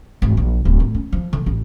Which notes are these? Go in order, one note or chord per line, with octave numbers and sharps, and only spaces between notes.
G#1
A#1
D1
A2
C#4
F3
D3
A1